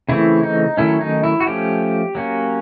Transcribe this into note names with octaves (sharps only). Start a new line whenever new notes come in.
C#3 E3 A3 C4 E4
D#4
D#3 F#3 A3 C#4 E4
D#4
E4
F#4
F3 A3 C#4 G4
F#3 A#3 C#4